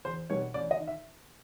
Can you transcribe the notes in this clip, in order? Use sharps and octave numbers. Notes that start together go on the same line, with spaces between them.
E2 C5
B2 G3 B3 D#4 C#5
A1 D5
D#5
D#3
E5